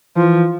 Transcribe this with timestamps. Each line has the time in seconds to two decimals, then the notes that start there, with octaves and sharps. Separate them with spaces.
0.16 E3 F3